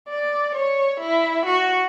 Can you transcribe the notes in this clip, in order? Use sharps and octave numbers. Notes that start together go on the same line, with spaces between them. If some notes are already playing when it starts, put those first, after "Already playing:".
D5
C#5
E4
F#4